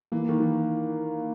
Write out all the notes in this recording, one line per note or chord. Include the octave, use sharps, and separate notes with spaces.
E3 A#3
D#3
E3